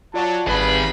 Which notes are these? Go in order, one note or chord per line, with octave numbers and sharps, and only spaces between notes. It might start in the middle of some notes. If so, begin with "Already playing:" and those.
F#3 F4 D5 A5
G#1 D#3 G3 G#4 B4 B5